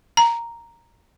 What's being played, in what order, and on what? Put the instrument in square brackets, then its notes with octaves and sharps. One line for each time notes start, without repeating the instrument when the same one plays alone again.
[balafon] A#5